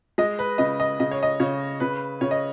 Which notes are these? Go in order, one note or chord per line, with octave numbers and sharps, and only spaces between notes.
G#3 D#5
B4
C#3 D#5
D#5
C#3 D#5
C#5
D#5
C#3 C#5
C#3 B4
C#3 C#5
D#5